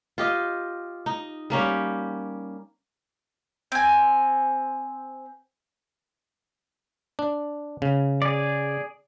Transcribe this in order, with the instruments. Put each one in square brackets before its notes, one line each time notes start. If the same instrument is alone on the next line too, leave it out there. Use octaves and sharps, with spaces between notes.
[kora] F4 G4 D#5
D#4
G3 A#3 C#4 G4
[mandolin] C4 G#5
[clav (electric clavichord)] D4
C#3
[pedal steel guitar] G#4 D5